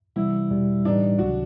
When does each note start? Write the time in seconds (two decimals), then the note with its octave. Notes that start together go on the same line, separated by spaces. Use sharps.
0.16 C3 E3 G3 B3 E4
0.50 E2 B2 G3
0.85 A2 E3 G3 B3 D4 D#4
1.19 C#2 C3 D#3 F#3 F#4